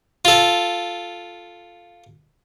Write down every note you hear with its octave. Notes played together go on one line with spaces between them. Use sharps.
F4 A4